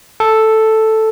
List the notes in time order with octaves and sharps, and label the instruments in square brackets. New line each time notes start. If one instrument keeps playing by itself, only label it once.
[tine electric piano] A4